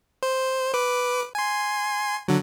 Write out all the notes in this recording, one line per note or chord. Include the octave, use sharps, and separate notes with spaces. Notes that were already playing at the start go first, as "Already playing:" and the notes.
C5
B4 D6
G#5 C6
D3 F#3